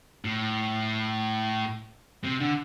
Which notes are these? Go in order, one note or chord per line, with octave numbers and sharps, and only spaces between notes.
A2
C3
D3